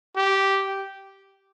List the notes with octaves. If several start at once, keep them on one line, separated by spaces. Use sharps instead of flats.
G4